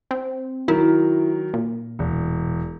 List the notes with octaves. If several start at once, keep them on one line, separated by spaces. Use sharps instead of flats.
C4
D#3 F#3 E4 A#4
A#2
E1